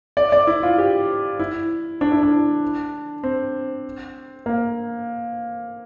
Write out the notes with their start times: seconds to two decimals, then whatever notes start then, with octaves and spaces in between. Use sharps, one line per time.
0.17 D5
0.32 D5
0.47 E4
0.63 F4
0.78 G4
1.39 E4
2.01 D4
2.12 E4
2.23 D4
3.23 C4
4.46 A#3